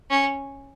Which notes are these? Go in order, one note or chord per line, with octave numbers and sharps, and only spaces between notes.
C#4